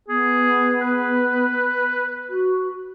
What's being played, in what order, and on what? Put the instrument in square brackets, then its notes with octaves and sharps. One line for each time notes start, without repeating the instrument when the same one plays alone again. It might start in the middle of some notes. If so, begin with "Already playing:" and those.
[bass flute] B3 [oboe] G#4
[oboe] B4
[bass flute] F#4